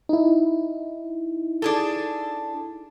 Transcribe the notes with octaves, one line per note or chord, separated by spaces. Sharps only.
D#4 E4
D4 G#4 A4